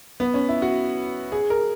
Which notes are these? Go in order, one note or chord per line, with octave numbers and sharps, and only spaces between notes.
B3
C#4
E4
F#4
G#4
A#4